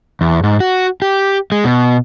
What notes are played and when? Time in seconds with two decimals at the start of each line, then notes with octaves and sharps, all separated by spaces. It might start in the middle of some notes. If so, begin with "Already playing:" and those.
0.21 E2
0.43 G#2
0.60 F#4
1.02 G4
1.52 G#3
1.64 B2